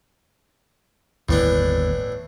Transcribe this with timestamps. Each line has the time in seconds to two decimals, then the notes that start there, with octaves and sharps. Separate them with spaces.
1.29 G1 D#2 A2 E3 B3 D4